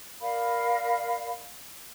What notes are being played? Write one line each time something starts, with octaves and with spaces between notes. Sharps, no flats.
A#4 D5 F5 B5